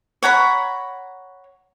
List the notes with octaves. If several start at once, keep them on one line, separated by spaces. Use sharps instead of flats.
C#5 F#5 A#5 B5